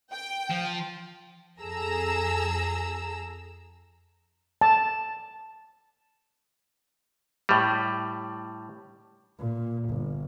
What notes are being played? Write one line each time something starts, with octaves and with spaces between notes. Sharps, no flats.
G5
F3
F2 G#4 A4 A#5 E6
A5
A2 G3
A#2
G1